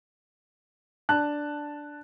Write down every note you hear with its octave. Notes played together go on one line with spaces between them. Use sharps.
D4 A5 F#6